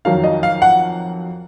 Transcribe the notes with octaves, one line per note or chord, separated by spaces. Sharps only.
F2 D#3 F#3 F5
D#5
F5
F#5